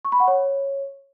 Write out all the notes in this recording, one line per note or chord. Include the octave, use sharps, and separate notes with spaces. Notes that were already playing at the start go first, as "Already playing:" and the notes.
C#6
B5
F#5
C#5